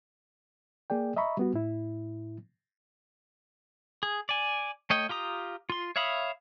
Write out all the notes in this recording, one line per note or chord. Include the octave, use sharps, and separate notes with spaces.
A#3 G#4 D5 G5
D#5 E5 A#5 B5 C#6
G3 B3 F#4
A2 E4
G#4
D5 G#5
A3 C#5 D#5 G5
F4 G4 A#5 D#6
F4 C6
C#5 E5 F5 B5 D#6